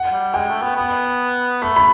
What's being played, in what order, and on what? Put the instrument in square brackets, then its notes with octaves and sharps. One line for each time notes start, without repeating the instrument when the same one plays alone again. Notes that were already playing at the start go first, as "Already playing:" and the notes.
Already playing: [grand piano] F#5
[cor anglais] G3
[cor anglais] G#3 [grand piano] G5
[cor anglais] A3
B3
B3
[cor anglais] A3 [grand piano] B5
[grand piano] B5